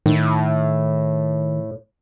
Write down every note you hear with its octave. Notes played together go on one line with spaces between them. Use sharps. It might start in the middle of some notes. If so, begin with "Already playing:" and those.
A2 D#3